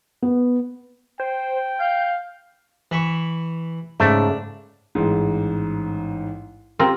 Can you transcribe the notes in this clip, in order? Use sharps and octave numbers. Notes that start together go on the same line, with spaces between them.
B3
C5 G5
F5 G6
E3 B5 C#6
G#2 C#3 A3 D4
A1 G#2
C4 F4 G4 A#4